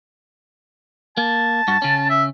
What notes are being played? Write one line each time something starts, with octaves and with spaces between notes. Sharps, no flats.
A#3 A5
G2 F#4
C#3 C#4
E5